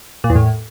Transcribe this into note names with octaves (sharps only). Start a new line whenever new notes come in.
A#2
E2
A2